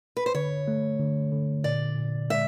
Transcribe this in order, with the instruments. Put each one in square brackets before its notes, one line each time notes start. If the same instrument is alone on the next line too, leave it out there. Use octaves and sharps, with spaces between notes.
[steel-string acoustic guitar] B4
C5
[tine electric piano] D3 [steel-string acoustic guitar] C#5
[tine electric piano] A3
D3
D3
[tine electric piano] A#2 [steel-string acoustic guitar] D5
[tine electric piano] A#2
[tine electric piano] G#3 [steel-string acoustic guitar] E5